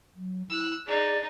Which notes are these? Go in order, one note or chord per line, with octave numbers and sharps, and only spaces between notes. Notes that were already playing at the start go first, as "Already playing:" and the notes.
F#3
E4 E6 F#6
D#4 G#4 D5